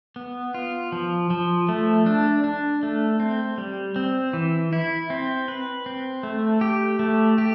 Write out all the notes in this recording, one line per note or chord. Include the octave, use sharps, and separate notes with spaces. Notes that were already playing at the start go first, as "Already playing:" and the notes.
B3
F4
F3
F3
A3
D4
D4
A3
C4
G3
C4
E3
E4
C4
B4
C4
A3
G4
A3
G4